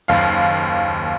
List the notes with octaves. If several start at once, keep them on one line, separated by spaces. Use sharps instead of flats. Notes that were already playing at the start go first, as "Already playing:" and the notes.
F#1 D#2 F5